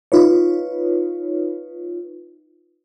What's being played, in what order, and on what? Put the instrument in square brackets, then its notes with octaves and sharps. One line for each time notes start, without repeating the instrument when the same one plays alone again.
[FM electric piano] D#4 F4 B4 C#5